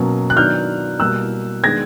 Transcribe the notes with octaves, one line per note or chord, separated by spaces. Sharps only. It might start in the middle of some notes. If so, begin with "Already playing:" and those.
Already playing: B2 F#3 A#3 C#4
F#6
D#3 F#3 B3 D4 F6 G6
B2 G3 A#3 E6 F#6
D#3 G#3 B3 D4 G#6 A#6